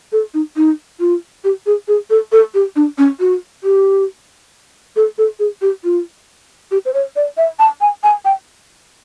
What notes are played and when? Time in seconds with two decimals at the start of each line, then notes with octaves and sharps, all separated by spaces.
0.12 A4
0.34 D#4
0.57 D#4
1.00 F4
1.44 G4
1.66 G#4
1.88 G#4
2.10 A4
2.32 A4
2.54 G4
2.76 D4
2.98 C#4
3.20 F#4
3.64 G4
4.96 A4
5.18 A4
5.39 G#4
5.62 G4
5.84 F4
6.71 G4
6.85 C5
6.94 C#5
7.16 D5
7.37 E5
7.59 A5
7.81 G#5
8.03 G#5
8.25 G5